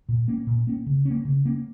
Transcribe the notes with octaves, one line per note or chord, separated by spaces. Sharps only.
A#2
A#3 C#4
A#2
A#3 C#4
C#3
A#3 C#4
C#3
A#3 C#4